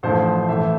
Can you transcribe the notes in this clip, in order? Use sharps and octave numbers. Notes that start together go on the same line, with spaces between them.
A1 G2 F3 A3 C5
A1 A2 E3 A3 E5